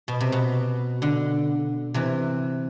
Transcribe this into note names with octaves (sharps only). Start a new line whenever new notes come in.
B2
C3
B2
D3
C3 E3